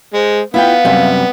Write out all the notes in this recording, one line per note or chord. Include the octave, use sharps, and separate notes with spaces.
G#3 C5
B3 E4 F4 F5 G5
F#2 C3 G3